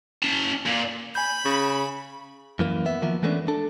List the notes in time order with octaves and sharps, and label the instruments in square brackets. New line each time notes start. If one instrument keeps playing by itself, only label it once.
[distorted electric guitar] C#4 A5
A#2
[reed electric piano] G#5 G6 [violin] B5
[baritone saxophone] C#3
[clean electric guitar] F#2 E3 A#3
B3 E5
D#3 F3 A#3 B3
E3 G#3 A3 B3 C#4 D4
D4 A4